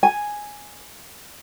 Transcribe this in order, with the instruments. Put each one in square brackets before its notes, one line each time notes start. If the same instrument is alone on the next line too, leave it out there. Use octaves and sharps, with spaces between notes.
[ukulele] G#5